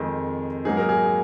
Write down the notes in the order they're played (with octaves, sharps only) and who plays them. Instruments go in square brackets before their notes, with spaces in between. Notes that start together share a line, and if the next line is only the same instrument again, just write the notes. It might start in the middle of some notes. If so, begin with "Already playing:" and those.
Already playing: [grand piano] F2 D#3 G#3
G#2 F#3 A#3 D#4 G#4
A#4
G#4